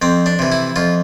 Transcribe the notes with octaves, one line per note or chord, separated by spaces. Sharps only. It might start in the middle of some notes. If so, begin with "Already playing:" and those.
F2 C4
D4
C3 E3
E4
F2 F4